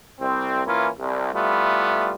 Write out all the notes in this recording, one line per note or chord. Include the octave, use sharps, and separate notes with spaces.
C2 C4
E3 A#3 C#4 E4 F4
C2
G3 A3 B3 E4 F4